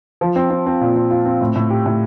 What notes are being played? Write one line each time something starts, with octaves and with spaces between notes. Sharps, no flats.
F3
C4
C4
C4
A#2
C4
F4
C4
A2
A2
G4
A2